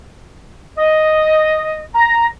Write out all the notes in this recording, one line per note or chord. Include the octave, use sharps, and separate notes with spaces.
D#5
A#5